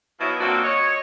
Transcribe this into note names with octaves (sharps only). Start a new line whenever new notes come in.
B2 F3 F#3 E4
A#2 F#3 C4 D4 F4 F#4
C#5 D#5